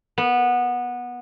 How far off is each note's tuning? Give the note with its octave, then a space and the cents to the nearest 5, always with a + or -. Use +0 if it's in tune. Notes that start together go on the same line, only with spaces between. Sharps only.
B3 -15